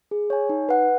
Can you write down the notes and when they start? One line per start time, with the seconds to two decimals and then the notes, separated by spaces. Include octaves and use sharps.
0.11 G#4
0.30 C#5 G#5
0.49 D#4
0.69 B4 F#5